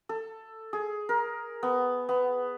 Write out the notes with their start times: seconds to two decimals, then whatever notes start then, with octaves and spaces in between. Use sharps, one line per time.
0.09 A4
0.73 G#4
1.09 A#4
1.63 B3
2.09 B3